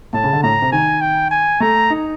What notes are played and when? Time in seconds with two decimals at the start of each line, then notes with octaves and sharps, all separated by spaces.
0.13 A2 A5
0.24 C#3
0.33 D3
0.43 A2 A#5
0.62 C3
0.72 D#3 G#5
1.01 G5
1.31 G#5
1.60 A3 A#5
1.90 D#4